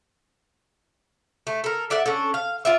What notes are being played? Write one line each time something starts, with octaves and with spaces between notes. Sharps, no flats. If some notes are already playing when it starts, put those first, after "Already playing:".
A3
A4 A#4
A4 D5 E5 F#5
C#4 D4 A4
F5
F4 D5 E5